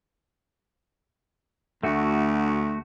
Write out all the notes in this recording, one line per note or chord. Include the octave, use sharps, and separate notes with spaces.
D2 A3 F#4